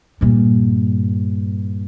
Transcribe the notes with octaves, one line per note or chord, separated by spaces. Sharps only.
G2 A#2